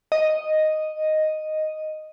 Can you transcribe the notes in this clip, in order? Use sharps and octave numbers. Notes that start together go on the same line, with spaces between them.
D#5